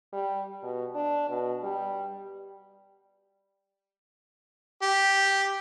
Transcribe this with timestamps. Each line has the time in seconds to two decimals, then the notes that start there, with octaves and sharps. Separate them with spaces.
0.13 G3
0.63 B2
0.95 D4
1.29 B2
1.63 G3
4.82 G4